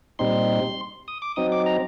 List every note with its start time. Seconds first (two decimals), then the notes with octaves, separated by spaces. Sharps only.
0.19 A#2 G3 C4 D#4 C6
1.08 D#6
1.22 D6
1.36 F#3 C4 D#4 D#6
1.52 D6
1.66 A#5